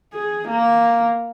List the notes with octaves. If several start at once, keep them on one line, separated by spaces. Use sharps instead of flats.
G#4
A#3